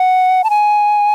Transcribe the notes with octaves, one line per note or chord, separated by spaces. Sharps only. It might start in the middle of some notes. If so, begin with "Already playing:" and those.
Already playing: F#5
A5
G#5